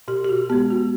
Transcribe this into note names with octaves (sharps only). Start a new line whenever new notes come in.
B2 G4
G4
F#4
G#3 B3 G4
F#4